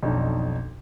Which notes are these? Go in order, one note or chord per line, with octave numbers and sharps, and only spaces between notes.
B1 F2 D4 D#4